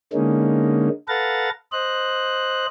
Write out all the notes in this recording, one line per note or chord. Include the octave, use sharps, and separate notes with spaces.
D3 G#3 A#3 C#4 D#4
A4 B4 F5 F#5 A#5 A6
C5 D#5 F#6